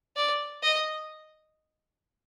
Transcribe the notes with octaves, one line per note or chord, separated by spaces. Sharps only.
D5
D#5